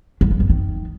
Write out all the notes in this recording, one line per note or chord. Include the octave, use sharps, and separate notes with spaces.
F#3
G2
F#2
D#3